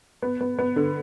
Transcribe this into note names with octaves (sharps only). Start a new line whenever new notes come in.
B3
B3
B3
D3